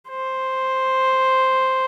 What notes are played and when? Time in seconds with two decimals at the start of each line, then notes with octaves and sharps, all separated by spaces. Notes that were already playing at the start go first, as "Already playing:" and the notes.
0.09 C5